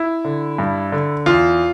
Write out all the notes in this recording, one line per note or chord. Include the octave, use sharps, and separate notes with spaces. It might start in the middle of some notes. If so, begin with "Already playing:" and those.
Already playing: E4
D3
G2
D3
E2 F4